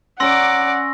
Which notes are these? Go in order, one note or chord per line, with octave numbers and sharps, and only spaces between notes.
C#4 D5 F#5 A#5 C6 D6 E6 A#6